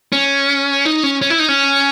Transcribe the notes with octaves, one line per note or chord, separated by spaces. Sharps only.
C#4
D#4
C#4
C#4
E4
D#4
C#4